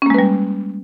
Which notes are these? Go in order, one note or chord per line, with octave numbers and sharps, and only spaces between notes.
G3 G#3 A#3 C#4 B4